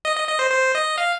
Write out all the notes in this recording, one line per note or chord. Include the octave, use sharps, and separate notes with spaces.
D#5
D#5
D#5
C5
C5
D#5
F5